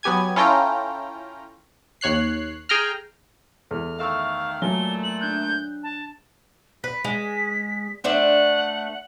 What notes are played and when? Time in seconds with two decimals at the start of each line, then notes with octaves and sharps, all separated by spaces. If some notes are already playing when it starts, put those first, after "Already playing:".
0.03 F#3 B3 G4 G#5 G#6
0.36 C#4 E4 F4 A4 G5 A#5
2.01 D#2 C#5 F#6 C7
2.69 G#4 G5 A#5 F6
3.71 E2 A4 F6
3.99 D#3 A3 E5 F5 C#6 E6
4.62 A#2 F#3 A3 G#5 G7
5.03 F#7
5.21 D4 F#6 G6
5.83 A5
6.84 B4 B6
7.04 G#3
8.04 A3 D4 C5 F#5